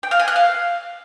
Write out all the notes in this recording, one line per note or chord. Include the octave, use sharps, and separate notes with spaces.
G5
F5
G#5
F#6
F5